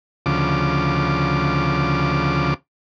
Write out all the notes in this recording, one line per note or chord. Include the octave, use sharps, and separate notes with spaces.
D2 C#3 F3 D6